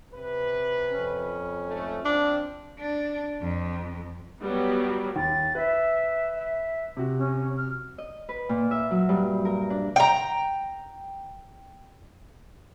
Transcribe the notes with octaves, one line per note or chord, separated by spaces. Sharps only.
C3 B4
F2 C#4
G#2 A3
F3 C4 D4
D4
F2
F#3 G3 B3
D#2 A6
B4 E5
E5
C3 F#4
C#4
F6
D#5
B4
A#2
E5
F#3
G2
A#4
D4
G5 A#5